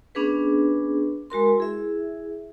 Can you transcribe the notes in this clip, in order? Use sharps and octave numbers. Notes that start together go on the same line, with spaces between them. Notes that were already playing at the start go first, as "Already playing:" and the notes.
B3 C#4 D4 G#4 B4
G#3 F#4 A#4 C6
E4 G#4 E5